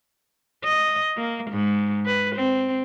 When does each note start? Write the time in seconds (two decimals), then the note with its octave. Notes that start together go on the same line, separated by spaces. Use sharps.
0.64 D#5
1.18 A#3
1.51 G#2
2.06 B4
2.36 C4